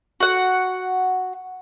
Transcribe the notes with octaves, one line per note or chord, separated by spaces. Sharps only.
F#4 F#5